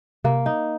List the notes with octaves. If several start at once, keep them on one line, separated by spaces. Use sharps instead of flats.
C3 A#3
D#4